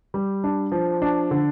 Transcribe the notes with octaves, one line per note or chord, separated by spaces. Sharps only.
G3
D4
F3
D4
D3